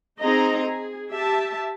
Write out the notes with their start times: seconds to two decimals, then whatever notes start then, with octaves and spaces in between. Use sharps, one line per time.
0.22 C4 D#4 G#4 D#5 A#5
0.67 G#4
1.12 G4 E5 A5